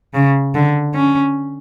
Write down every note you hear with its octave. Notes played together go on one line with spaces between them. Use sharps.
C#3
D3
C#4